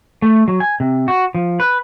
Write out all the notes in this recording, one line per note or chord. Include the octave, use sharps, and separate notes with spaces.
A3
F#3
G#5
C3
F#4
F3
B4